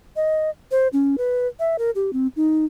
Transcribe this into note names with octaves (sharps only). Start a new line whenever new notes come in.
D#5
C5
C#4
B4
E5
A#4
G4
C4
D#4